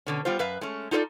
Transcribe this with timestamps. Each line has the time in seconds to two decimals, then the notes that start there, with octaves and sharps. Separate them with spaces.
0.06 B2 D3 C#4
0.25 G3 B3 F4 C5
0.39 F#2 B4 E5 F5
0.61 G#3 A3 C#4
0.91 D#4 F4 A4 C5 D5